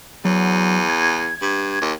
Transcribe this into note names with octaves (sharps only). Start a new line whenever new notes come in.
E2 F#3
G#6
G2
D#2